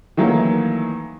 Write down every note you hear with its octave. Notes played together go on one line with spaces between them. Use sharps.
D#3 E3 F#3 A3 A#3